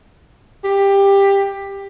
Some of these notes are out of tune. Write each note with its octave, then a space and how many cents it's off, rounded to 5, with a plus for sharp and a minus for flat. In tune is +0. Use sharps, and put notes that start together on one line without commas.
G4 +15